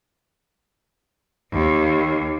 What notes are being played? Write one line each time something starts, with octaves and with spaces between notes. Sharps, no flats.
D#2